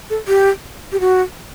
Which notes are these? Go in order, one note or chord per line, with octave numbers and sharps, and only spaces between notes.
A4
G4
G4
F#4